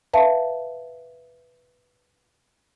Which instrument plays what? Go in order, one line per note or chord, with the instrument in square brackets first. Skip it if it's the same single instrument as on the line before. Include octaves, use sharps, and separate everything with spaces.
[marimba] B4 E5 F5 A5